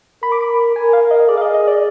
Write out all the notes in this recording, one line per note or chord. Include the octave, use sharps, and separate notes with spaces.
A#4 B5
D6
B5
A#4 G#5
F5
D#5
G#4 D5
F5
D#5
D#5
D5